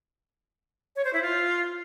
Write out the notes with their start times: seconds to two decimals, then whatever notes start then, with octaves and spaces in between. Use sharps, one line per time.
0.96 C#5
1.05 C5
1.13 E4
1.22 F4